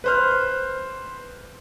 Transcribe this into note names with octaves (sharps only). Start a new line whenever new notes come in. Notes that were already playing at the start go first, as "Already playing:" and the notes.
B4 C5 F6